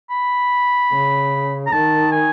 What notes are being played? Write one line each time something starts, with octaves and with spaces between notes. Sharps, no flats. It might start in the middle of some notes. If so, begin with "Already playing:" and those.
B5
C#3
A#5
D#3 A5
G#5